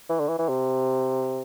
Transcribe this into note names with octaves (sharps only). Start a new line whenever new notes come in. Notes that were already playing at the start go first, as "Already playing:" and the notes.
E3
D3
E3
E3
C3